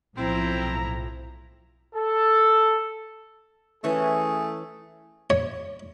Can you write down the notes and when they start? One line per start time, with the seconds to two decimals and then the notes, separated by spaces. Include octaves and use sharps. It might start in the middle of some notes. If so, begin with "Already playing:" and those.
0.17 B1 A2 F3 C4 E4 A#5
1.96 A4
3.84 E3 A3 C#4 G#4
5.30 C#5